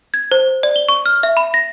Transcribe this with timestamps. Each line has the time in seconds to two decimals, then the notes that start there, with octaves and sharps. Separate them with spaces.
0.14 G#6
0.32 C5
0.63 D5
0.76 G7
0.89 C#6
1.06 F6
1.23 E5
1.37 B5
1.54 A#6